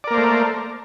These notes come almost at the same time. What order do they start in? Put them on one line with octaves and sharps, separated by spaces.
D5 A#4 A#3 C5 A3